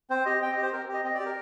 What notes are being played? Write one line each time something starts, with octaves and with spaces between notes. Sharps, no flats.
C4 C5
G4 D#5
C4 G5
D#5
G4
C5
C4 A#4
G4
D#5
C4 D#5
D5
G4
A#4